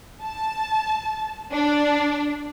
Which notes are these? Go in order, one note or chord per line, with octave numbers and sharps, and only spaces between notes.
A5
D4